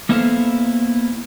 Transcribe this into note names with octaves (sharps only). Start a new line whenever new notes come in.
A#3 B3 E4 A4 C5 F5